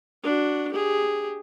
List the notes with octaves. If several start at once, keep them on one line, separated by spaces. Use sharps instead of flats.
D4 F#4
G4 G#4